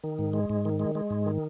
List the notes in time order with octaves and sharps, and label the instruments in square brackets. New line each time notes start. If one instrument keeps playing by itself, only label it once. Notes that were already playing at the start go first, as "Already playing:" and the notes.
[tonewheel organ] D#3
G#2
G#3
G#2
D#3
G#3
G#3
G#2
D#3